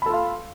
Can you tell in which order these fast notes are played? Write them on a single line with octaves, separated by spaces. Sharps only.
B5 A4 F4 F5